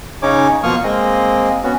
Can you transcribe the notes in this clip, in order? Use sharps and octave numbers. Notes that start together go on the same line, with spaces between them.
C#3 C#4 D#4 C#5 D6
B2 F3 A#3 C#6 D#6 F6
G#3 A#3 C4 D#5
B3 C#4 F#4